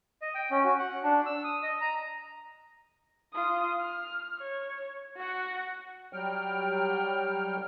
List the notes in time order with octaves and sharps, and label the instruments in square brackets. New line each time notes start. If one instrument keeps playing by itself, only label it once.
[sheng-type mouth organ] D#5
G5
C#4
F#4
F#5
D4
E6
D#6
D#5
A#5
[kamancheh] F4 D#6
F6
C#5
F#4 F#5
[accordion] F#3 G3 G5 F6